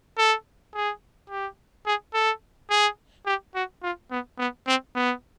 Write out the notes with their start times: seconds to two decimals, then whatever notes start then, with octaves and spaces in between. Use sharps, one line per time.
0.18 A4
0.74 G#4
1.30 G4
1.86 G#4
2.14 A4
2.70 G#4
3.26 G4
3.55 F#4
3.83 F4
4.11 B3
4.39 B3
4.67 C4
4.95 B3